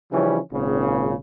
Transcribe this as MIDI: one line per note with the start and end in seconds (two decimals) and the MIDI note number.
0.12 0.39 49
0.12 0.39 52
0.12 0.39 53
0.12 0.39 55
0.12 0.39 61
0.12 0.39 62
0.52 1.15 32
0.52 1.15 46
0.52 1.15 49